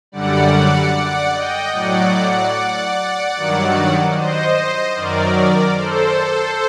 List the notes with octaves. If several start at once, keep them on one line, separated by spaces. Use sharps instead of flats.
F#2 D3 G3 D5 F#5
D5 F#5
D#5 G5
A2 F#3 D5 F#5
G2 D#3 F#3
C5 D#5
F#2 D#3 F#3 A#4 D5
A4 C5